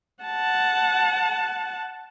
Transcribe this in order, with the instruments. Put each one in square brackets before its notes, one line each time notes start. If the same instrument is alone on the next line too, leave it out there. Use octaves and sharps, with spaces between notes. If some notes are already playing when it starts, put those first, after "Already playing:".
[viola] F#5 A5